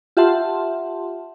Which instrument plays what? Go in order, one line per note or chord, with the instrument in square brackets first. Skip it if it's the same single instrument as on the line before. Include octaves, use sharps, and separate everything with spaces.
[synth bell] F4 G4 E5 F#5 A5 C6